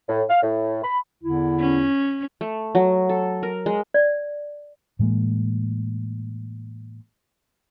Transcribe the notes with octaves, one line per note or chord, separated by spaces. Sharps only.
A2
F5
A2
B5
E2 D3 E4
C#4
A3
F#3
A4
A#4
G#3
D5
A2 E3 G#3 A#3